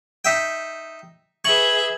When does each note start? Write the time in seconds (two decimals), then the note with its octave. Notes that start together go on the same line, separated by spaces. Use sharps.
0.25 D#4 E5 G5
1.44 G#4 B4 E5 C#6 G#6 F#7